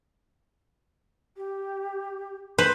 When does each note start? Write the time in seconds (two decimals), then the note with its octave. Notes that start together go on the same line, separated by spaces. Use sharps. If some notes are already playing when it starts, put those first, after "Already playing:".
1.37 G4
2.58 B4 C5 C6